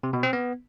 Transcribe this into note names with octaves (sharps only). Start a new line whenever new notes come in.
C3
B2
C4
B3